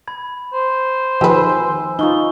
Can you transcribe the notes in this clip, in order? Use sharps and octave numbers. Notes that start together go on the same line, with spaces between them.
B5 G#6
C5
D#3 F3 G4 B4 G#5 E6
D#4 F4 C#6 G7